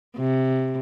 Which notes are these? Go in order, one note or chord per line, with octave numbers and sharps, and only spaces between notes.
C3